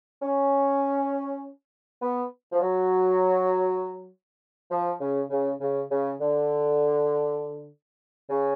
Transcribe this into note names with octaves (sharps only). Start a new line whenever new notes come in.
C#4
B3
F3
F#3
F3
C#3
C#3
C#3
C#3
D3
C#3